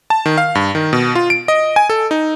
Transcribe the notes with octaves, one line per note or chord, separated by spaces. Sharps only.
A5
D#3
F5
G2
D#3
B2
F4
D7
D#5
G#5
A4
D#4